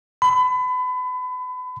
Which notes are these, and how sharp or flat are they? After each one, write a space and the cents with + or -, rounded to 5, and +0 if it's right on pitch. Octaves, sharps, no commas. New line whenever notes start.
B5 +30